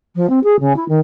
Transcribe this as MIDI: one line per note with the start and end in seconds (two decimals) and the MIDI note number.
0.15 0.29 53
0.29 0.39 60
0.44 0.59 68
0.59 0.76 49
0.76 0.86 64
0.88 1.00 51